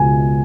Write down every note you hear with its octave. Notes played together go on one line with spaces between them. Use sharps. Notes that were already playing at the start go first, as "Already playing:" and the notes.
Already playing: C#2 B2 G#3 G#5